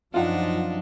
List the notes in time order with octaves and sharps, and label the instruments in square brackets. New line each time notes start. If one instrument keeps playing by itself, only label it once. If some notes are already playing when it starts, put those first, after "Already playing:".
[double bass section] F#2 F3 F#3 [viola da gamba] D4 D#4 [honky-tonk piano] F4 F#5